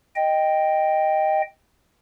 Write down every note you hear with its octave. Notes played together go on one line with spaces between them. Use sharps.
D#5 G5